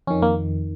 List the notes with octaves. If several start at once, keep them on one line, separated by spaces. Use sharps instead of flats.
F2 D#3 C#4
A#3